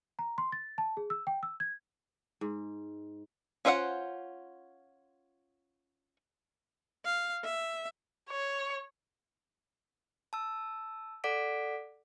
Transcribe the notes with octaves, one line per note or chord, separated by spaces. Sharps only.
A#5
C6
A6
A5
G#4
E6
G5
E6
G#6
G#2
C#4 F4 C5 E5 F#5
F5
E5
C#5
A5 E6
A4 D5 F#5 D6 B6 D7